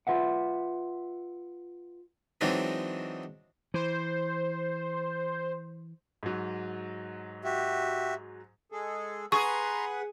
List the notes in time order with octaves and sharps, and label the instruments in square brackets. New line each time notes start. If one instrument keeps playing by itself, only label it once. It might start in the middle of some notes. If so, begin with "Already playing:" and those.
[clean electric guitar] F4 B4 E5 F#5
[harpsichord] E3 F#3 G#3 C4 D4 D#4
[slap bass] E3 [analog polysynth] C5
[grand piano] G#2 F#3
[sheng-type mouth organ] F#4 G4 E5
[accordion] G#3 G#4 A4
[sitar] G#4 [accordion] B4 F#5 [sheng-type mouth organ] A#5 C6 [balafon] C#6